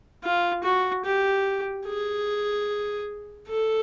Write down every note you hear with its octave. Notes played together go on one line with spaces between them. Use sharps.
F4
F#4
G4
G#4
A4